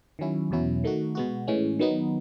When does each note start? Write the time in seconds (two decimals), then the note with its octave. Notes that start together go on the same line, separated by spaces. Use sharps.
0.19 D#3 F#3 C#4 E4
0.51 E2 B2 F#3 C#4 E4
0.84 D#3 A3 D#4 F#4
1.15 B2 G#3 B3 F#4
1.47 A2 E3 G#3 C#4
1.79 D#3 F#3 B3 D#4